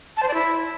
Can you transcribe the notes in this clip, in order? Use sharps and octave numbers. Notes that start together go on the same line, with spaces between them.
A5
C5
D5
E4